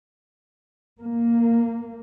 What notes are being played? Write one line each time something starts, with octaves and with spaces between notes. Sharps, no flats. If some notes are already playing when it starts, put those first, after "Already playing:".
A#3